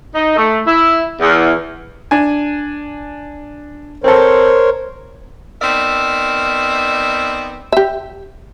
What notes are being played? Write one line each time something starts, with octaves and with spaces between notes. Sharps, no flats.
D#4
A3
E4
E2
D4 G#5
C4 A4 A#4 C5 C#5
B3 C4 D#4 A#4 D5 E5
G4 E5